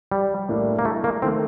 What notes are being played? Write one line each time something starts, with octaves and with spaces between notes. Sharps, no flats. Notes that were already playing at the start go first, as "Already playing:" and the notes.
G3
A2 G3 A#3 D4
A#3
A3
A#3
D#3 A3 C4